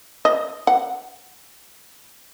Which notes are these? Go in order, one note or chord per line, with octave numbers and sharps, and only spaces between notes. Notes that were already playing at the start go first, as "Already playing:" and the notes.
D#5
F#5